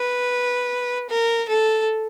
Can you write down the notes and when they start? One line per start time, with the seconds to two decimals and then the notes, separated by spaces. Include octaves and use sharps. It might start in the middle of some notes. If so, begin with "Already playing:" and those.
Already playing: B4
1.10 A#4
1.49 A4